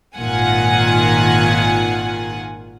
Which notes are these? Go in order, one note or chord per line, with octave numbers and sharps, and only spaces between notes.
G#1 A#2 D#3 F4 F#5 G#5